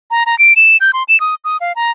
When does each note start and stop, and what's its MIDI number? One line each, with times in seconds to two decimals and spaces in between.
0.11 0.24 82
0.26 0.38 82
0.39 0.53 98
0.56 0.77 100
0.81 0.91 91
0.93 1.03 84
1.09 1.19 100
1.20 1.35 87
1.45 1.57 87
1.61 1.73 77
1.76 1.91 82